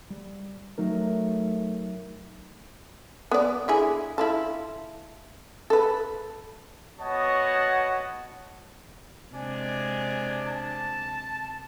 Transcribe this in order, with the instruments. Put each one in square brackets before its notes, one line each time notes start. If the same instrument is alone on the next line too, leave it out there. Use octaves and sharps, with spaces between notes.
[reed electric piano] G3
[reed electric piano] F#3 D#4 A#4 [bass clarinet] A3
[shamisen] B3 D5
D3 E4 G#4
E4 F4 A4
A4 B4
[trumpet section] B3 F#4 C#5 D#5 F#5 A5
[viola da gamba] C3 G#3 [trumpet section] D4 G#5
[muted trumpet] A5